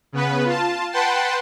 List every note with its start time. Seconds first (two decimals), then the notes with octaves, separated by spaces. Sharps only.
0.13 C#3 B3 B4
0.45 F4 A5
0.92 B4 F#5 G5 A5 C6